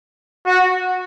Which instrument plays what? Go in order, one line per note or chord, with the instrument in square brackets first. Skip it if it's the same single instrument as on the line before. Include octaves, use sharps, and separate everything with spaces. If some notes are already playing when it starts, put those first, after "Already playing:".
[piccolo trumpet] F#4